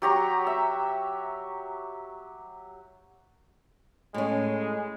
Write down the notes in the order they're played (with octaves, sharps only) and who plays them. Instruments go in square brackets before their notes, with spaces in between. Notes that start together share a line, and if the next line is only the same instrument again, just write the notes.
[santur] F#3 G4 A#5 C#6
E5
[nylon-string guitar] A2 C#4 [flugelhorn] G#3